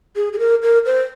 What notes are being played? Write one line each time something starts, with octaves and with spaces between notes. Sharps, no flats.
G#4
G#4
A#4
A#4
C5